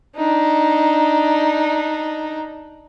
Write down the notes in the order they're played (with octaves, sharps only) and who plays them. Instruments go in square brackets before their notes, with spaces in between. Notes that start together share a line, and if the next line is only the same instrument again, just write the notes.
[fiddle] D4 D#4